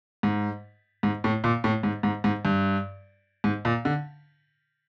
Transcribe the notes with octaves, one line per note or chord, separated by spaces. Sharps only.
G#2
G#2
A2
A#2
A2
G#2
G#2
G#2
G2
G#2
A#2
D3